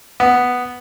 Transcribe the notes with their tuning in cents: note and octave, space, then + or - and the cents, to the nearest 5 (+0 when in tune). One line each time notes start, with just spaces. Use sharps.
B3 +0